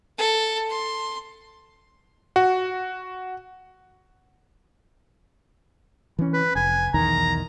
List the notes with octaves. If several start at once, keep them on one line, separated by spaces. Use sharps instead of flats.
A4
C6
F#4
E3 C#4
B4
F1 G#5
B1 E2 D#3 A#5